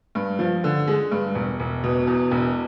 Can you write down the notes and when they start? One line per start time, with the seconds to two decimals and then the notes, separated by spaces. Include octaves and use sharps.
0.15 G2
0.39 F3
0.64 D3
0.87 G#3
1.11 G2
1.35 E1
1.59 E1
1.84 B2
2.07 E2
2.31 E1